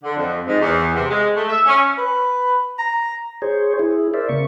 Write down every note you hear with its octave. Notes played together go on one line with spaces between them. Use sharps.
D3
F2
G#2
E2
C3
G#3
A3
E5
C#4
B4
A#5
G#4 C5 C#5
E4 G#4
A#4 C5 D5 E5
C#3 A#3 C#6